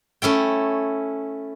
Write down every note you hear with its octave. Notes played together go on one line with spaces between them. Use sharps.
A3 C#4 E4 G5